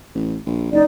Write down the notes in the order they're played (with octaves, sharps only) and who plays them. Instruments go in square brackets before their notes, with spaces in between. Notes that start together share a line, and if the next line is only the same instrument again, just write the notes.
[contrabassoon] A1
A#1
[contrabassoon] F#1 [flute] D#4 [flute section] D5